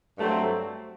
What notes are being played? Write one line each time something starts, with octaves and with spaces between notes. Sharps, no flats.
G2 F#3 A3 C4